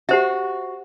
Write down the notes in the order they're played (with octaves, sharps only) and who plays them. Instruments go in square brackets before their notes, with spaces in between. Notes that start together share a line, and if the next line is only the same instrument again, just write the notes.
[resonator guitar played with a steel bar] F#4 [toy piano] G4 C5 E5